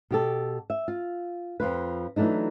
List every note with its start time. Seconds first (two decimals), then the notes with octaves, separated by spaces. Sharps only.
0.11 B2 G4 A4
0.70 E5
0.88 F4
1.60 F2 F3 F4 B4
2.16 E3 F#3 A3 D4 D#4